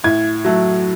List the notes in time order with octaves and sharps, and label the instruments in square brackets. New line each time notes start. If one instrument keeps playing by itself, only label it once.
[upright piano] A2 G#6
F#3 A3